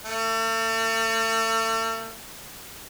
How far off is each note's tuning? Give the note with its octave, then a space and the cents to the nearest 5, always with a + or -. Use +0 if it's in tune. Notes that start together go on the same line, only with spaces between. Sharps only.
A3 +40